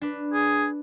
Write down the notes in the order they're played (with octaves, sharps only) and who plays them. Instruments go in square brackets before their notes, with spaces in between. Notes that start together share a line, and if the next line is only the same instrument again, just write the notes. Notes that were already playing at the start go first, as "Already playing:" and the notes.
[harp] D4 B4
[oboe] G#4